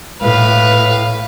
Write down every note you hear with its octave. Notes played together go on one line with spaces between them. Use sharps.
A2 B4 F5